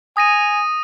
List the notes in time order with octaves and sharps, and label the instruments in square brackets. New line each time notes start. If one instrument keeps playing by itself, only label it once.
[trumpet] G#5 [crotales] D#6 A#6 D#7